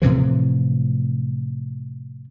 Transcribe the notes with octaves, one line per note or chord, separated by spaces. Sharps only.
A2 C3 E3 F3